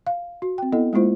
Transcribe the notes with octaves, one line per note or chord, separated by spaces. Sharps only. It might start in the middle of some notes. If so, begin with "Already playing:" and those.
F5
F#4
C4 G5
B3 E4 A4 D#5
G#3 A#3 E4 F4 C5